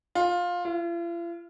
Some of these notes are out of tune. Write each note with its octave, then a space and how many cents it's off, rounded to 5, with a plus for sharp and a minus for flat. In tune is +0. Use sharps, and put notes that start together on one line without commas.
F4 +15
F4 -45